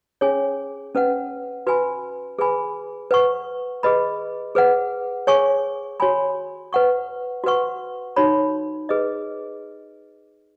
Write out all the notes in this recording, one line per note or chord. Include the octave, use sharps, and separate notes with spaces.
C#4 G#4 C#5 G#5
C#4 B4 F#5
F#4 B4 G#5 B5
G#4 B4 G#5 B5
B4 F#5 C#6
G#4 B4 D#5 B5
G#4 B4 F#5
G#4 C#5 G#5 C#6
F#4 C#5 G#5 B5
B4 F#5 C#6
F#4 B4 F#5 C#6
D#4 F#4 C#5 B5
G#4 B4 D#5